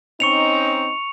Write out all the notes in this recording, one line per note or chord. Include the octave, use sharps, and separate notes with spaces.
C4 C#4 D#4 C#6 C#7 F7